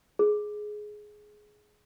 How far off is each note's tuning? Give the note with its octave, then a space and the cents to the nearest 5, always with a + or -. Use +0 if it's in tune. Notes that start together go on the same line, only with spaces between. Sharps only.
G#4 +10